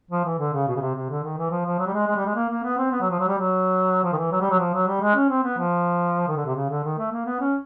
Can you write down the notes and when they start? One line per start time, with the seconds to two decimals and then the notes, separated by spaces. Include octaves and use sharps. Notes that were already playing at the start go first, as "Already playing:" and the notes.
0.11 F3
0.25 E3
0.39 D3
0.53 C#3
0.68 B2
0.76 C#3
0.81 C3
0.95 C3
1.10 D3
1.23 D#3
1.38 E3
1.51 F3
1.65 F3
1.79 F#3
1.87 G3
1.94 G#3
2.07 G#3
2.16 G3
2.26 G#3
2.35 A#3
2.49 A#3
2.63 B3
2.77 C4
2.91 B3
3.01 F#3
3.10 F3
3.20 F#3
3.28 G3
3.38 F#3
4.03 F3
4.13 D#3
4.17 E3
4.31 F#3
4.41 G3
4.50 F#3
4.59 F3
4.74 F#3
4.88 G3
5.01 G#3
5.15 C#4
5.29 C4
5.44 B3
5.58 F3
6.28 D#3
6.37 D3
6.46 C3
6.56 C#3
6.70 D3
6.84 D#3
6.98 A3
7.12 A#3
7.26 B3
7.40 C#4